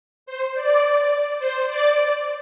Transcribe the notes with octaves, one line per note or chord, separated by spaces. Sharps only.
C5
D5
C5
D5